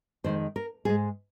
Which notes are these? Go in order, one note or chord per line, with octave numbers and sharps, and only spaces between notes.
F2 D#3 G#3 C5
A#4
G#2 G#3 G#4